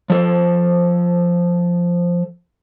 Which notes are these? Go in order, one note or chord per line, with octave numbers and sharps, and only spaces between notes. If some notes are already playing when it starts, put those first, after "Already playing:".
F3 A4 C5